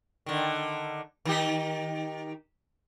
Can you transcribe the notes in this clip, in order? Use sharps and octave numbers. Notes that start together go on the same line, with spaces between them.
D3 D#3
D#3 D#4 G4